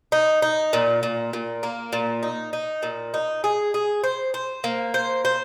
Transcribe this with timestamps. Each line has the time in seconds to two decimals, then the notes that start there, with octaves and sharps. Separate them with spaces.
0.12 D#4
0.42 D#4
0.73 A#2
1.03 A#2
1.33 A#2
1.63 A#3
1.93 A#2
2.23 D#4
2.53 D#4
2.83 A#2
3.14 D#4
3.44 G#4
3.74 G#4
4.04 C5
4.34 C5
4.64 A#3
4.94 C5
5.25 C5